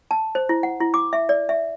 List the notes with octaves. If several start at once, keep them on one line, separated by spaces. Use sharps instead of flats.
A5
C5
E4
F#5
E4
D6
E5
D5
E5